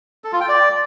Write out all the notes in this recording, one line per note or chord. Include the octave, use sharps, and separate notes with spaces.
A4
F4
G5
D5